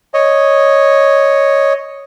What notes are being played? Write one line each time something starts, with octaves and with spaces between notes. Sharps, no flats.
C#5 D#5